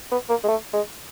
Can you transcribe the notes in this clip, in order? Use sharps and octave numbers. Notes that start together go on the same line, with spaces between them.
B3
A#3
G#3
A3
G#3